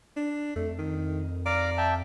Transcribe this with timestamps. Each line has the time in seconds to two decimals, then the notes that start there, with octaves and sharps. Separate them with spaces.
0.17 D4
0.56 F2 A3
0.79 D#3
1.46 D5 F5 A#5 D6
1.78 E5 G5 A5